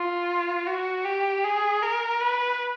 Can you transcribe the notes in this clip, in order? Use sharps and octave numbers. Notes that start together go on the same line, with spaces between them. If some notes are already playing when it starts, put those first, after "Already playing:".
Already playing: F4
F#4
G4
G#4
A#4
B4